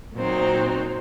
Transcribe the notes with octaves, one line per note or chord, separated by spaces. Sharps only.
A#2 F#3 C4 D#4